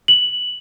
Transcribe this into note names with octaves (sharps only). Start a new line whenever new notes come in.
F#7